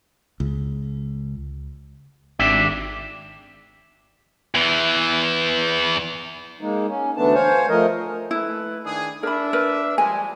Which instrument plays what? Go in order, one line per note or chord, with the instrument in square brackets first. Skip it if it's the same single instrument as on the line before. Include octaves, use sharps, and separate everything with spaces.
[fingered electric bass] C#2
[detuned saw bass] G#1 [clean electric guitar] D4 G4 E5
[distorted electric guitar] E2 E3
[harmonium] G#3 A#3 D#4
C#4
D2 E3 A3 B3 D4 A5
C5 C#5 F5 G#5
F3 A3 A#4 D#5
[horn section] A3 B4 [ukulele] E4
[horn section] D#3 D4 G#4
[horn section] D4 E5 [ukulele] A#4 B5
[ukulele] A#4 B4
[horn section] F3 G3 G#3 [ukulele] G#5